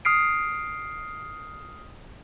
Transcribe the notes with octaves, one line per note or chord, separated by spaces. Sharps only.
D#6 F6 C7 D7